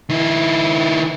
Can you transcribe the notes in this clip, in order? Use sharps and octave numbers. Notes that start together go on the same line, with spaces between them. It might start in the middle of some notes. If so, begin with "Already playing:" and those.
D#3 E4